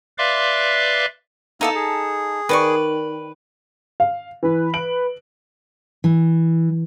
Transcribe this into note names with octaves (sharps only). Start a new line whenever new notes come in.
B4 D5 E5 F5 C6 D6
A#3 B3 D#4 E4 A4 G#5 A5
G#4
D#3 B4 D5 C#6
F5
E3 B4
D7 F#7
E3